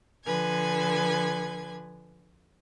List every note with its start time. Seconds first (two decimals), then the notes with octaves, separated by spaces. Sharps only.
0.24 D3 F3 B4 G#5 G#6